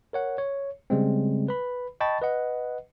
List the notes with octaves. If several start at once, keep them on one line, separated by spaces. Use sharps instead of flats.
A#4 C#5 F#5
C#5
C#3 G3 G#3 C4
B4 B5
D#5 G5 A5 B5 C#6 A6
B4 D#5 F#5